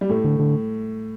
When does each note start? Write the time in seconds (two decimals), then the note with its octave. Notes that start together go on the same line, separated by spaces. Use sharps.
0.01 G3
0.09 A2 A3
0.24 D3
0.40 D3